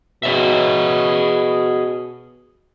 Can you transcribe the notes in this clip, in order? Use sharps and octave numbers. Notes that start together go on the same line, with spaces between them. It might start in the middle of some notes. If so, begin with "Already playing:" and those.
B2 G#4 C#5 E5